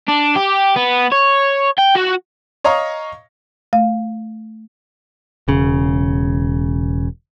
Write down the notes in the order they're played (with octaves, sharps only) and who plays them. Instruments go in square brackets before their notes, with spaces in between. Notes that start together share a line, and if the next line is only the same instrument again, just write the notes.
[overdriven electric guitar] D4
G4
B3
C#5
G5
F#4
[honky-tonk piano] C#5 D#5 F5 A#5 C#6
[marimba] A3 F5
[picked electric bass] E1 C#3